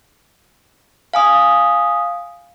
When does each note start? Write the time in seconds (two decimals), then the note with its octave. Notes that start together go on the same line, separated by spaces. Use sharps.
1.14 F5 G#5 D#6